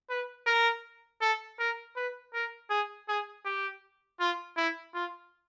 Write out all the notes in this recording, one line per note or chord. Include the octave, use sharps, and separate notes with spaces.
B4
A#4
A4
A#4
B4
A#4
G#4
G#4
G4
F4
E4
F4